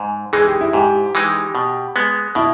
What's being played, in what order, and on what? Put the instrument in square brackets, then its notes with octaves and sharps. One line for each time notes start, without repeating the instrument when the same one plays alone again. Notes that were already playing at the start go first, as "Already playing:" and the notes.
Already playing: [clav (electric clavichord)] G#2
[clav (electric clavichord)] E3 G#3 D#4 [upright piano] G#4
[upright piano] G4
E4
[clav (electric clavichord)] G#2 [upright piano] G4
[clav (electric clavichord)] E3 G#3 D#4
B2
G#3 B3
[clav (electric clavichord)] B2 [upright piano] E4